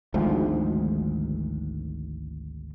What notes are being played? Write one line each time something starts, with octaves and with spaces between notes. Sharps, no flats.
G#1 D2 G#2 F3